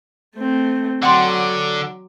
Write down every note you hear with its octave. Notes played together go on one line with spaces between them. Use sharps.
A3 C4
D3 F#3 F#5 G5 C6 D6